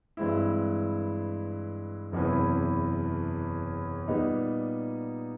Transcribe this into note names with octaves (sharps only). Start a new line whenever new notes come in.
G2 E3 G#3 C4 E4
F#1 E2 C3 E3
A#2 G3 B3 D#4